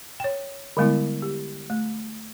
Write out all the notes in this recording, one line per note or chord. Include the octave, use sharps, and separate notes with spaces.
C#5 G5
D3 G3 G#3 B3 E4
G4
A3